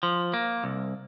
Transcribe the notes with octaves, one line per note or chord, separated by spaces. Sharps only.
F3
A#3
C2